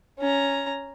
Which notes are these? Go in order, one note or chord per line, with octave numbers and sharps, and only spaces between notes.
C#4 A#5